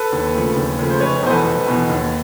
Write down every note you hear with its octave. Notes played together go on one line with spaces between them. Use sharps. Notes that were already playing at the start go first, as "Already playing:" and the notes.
Already playing: A4 B4
D#2
C#3 F3 A3
D#2
C#3 F3 A3
C5
F1 B4 C#5
E2 B2 C5
A4 B4
F1
E2 B2
D#2